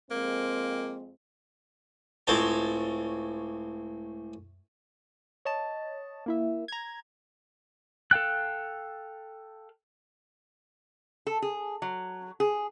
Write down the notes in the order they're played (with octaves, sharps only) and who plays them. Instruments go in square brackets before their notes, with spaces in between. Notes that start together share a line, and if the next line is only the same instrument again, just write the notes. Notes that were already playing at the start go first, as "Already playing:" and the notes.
[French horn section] F2 G#3 C4 [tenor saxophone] A#3
[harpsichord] C#2 A2 C4 C5 C#5 A5
[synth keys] C#5 D#5 A5
A#3 E4 E5
A#5 G#6
[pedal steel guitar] A4 F5 G5 F#6
[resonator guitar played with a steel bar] A4
G#4
F#3
G#4